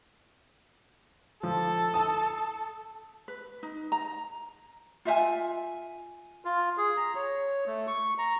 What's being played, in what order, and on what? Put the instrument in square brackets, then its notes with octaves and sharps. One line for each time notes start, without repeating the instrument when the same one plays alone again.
[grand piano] F3 [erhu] A4
[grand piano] A5 D#6
[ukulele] B4
D#4
A#5
F4 E5 F5 G#5
[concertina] F4
G#4
A#5
C#5
A3
C#6
A#5